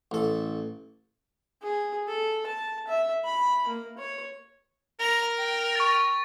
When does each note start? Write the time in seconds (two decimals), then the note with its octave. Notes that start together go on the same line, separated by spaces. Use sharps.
0.11 A1 A4
1.62 G#4
2.07 A4
2.47 A5
2.88 E5
3.25 B5
3.68 A#3
3.98 C#5
5.00 A#4 A#5
5.38 G5
5.76 C#6 A6